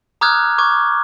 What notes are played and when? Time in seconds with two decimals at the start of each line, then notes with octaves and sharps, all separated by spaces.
0.21 A#5 D6 D#6 F6 F#6 G#6
0.58 C#6 D6 G#6